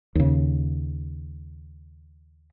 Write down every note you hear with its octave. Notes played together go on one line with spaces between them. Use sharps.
D#2 C#3